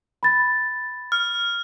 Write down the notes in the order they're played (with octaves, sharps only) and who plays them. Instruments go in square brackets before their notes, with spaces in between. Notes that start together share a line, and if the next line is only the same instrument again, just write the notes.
[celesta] B5 A6
[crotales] F6